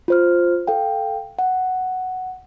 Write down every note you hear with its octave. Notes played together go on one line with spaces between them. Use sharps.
F4 C5 F6
A4 F5 G5
F#5